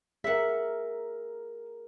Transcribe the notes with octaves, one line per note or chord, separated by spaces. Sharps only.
G#4 A#4 E5 F#5